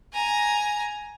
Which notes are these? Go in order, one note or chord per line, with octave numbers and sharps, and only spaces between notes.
G#5 A#5